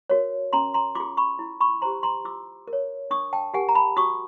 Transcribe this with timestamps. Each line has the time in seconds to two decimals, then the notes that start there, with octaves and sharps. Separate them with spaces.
0.10 F#4 A#4 C#5
0.53 C#4 A#5 C6
0.74 A#5 C6
0.95 F4 C6 D6
1.00 G#4
1.17 B5 C#6
1.39 E4
1.60 B5 C#6
1.82 G4 C5 A#5 C6
2.03 A#5 C6
2.25 F4 D6 E6
2.68 A#4
2.73 C#5
3.11 D4 C#6 D#6
3.33 G5 A5
3.54 G4 A#4 F#5 G#5
3.69 A#5
3.75 A5 B5
3.97 F#4 C#6 D#6